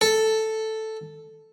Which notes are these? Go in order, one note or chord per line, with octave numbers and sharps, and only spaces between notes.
A4